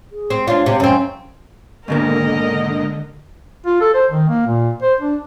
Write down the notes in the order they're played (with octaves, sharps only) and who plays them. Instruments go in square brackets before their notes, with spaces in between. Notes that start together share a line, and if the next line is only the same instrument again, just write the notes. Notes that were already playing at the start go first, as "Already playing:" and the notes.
[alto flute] G#4
[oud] C4
[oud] D4 F4 [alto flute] C#5
[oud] C3
[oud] F#2 C4 [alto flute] C#4
[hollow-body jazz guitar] G#2 B2 A#3 [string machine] D3 [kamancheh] A#4 D#5
[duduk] F4
A4
C5
D#3
A#3
A#2
C5
D4